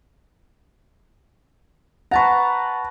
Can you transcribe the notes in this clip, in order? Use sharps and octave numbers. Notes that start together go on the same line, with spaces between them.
B4 F#5 A5 A#5 C#6